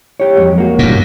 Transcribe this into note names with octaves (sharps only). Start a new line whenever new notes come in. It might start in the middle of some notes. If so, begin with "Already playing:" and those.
G4 C#5
F2 F#3 G#3
A#3 F#4
G2 A#2